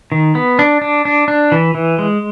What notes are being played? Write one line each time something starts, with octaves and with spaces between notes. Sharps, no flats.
D#3
B3
D4
D4
D4
D4
E3
E3
G#3